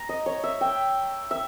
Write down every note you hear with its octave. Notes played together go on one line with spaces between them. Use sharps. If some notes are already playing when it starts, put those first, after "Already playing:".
Already playing: A#5
D#5
C#5
E5
G5
E5